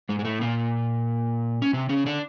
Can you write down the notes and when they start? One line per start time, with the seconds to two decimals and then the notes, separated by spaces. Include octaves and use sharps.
0.09 G#2 G#3
0.19 G#3
0.25 A2 A3
0.41 A#2 A#3
1.62 C#4
1.73 C3 C4
1.89 C#3 C#4
2.06 D3 D4